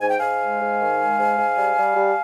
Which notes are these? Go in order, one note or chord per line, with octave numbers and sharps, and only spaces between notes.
G#2 G#5
G5
G#2 F5 G#5
G#3
G#2
D#3
G#3
G#2
G#2
G3
G3
G3